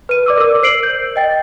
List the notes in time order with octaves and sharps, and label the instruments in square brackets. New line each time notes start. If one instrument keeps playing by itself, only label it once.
[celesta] B4 D#7
D5 D6 E6
A#4 E6
C5 C7 D7 F#7
G6
D#5 G5 A6